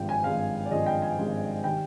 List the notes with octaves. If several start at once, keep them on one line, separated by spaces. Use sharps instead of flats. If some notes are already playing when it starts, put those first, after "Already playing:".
Already playing: G#1 G2 F3 G#3 G5
G#5
G#1 G2 F3 G#3 F5
D5
G#1 G2 F3 G#3 D#5
G5
G#5
G#1 G2 F3 G#3
D#3 G3 G5